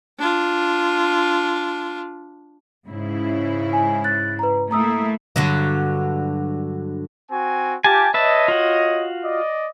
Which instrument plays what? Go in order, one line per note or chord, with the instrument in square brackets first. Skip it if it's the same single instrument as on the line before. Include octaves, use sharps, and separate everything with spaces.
[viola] D4 F4
[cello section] G#2 C#3 E4
[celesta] G#5
F#6 A6
B4 A#5
[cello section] A3 A#3 E4 [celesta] A#5 D#6 E6
[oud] G2 D3 F#3
[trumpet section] C4 F#4 G#5
[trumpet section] F4 G4 [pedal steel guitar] G#5 A5
[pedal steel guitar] B4 E5 A5 [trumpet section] C#5 D#5
[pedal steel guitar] F4 F#4
[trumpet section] D5 D#5